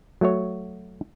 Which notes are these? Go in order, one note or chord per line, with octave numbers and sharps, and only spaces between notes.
F#3 A3 F#4 C#5